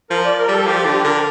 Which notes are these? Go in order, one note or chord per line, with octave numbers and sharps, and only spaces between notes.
F3 A#4
D5
A#4
G3 A4
F3 G4
D3 G4
D3 A#4